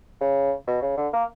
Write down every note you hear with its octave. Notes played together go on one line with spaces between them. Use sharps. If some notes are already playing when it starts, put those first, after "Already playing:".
C#3
B2
C#3
D3
A#3